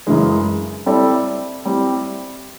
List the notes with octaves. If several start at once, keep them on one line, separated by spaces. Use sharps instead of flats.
F#2 C#3 E3 G#3
G3 C4 E4 A4 D5
G3 C4 E4 G4